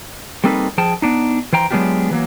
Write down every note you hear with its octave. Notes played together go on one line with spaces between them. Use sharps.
G3 A#3 C4 D#4 A4 B4
F3 G#4 G5 A5
B3 D4 D#4
E3 C5 G5 A#5
F#3 G#3 B3 D4 F4 G4
E3 F#3 A#3